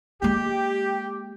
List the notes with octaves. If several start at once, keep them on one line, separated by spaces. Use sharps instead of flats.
G#3 A#3 G4